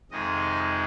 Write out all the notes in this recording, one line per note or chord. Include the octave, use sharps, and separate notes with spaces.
F2 C3 D#3 G#3 D#5